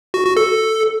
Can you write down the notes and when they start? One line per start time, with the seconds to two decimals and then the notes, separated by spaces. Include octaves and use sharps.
0.14 F#4
0.25 F#4
0.37 A4